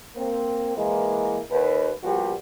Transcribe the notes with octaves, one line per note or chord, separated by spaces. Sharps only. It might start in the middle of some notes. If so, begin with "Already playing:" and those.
A#3 C4
E3 G#3 A#3
D#2 B4
F3 G3 A#3 B3 F#4 G4